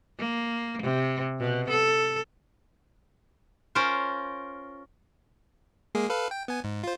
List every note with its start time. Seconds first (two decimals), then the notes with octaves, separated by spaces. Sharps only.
0.19 A#3
0.83 C3
1.39 B2
1.70 A4
3.75 C#4 F4 A#4 C5
5.95 G#3 A#3 G#4
6.10 A4 B4 F5
6.31 G5
6.48 B3 G#5
6.64 G#2
6.84 F4 C5